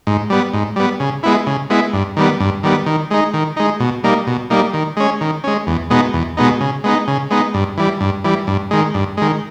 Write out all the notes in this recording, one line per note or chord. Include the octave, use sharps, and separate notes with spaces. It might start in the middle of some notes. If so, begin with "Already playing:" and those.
G#2
G3 B3
G#2
G3 B3
C#3
G#3 B3 E4
C#3
G#3 B3 E4
G2
D#3 G3 B3
G2
D#3 G3 B3
D#3
G#3 D#4
D#3
G#3 D#4
B2
G3 A#3 D#4
B2
G3 A#3 D#4
D#3
G#3 C#4
D#3
G#3 C#4
E2
B2 G#3 B3 D#4
E2
B2 G#3 B3 D#4
C#3
G#3 B3 D#4
C#3
G#3 B3 D#4
G2
E3 G3
G2
E3 G3
G2
D#3 G#3
G2
D#3 G#3